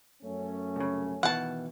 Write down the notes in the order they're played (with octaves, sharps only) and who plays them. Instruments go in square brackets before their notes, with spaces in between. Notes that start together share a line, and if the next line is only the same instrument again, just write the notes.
[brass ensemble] F#2 A3 C#4
[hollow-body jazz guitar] C2 C#3
[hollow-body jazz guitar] B2 D#3 E3 [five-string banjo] F#5 A5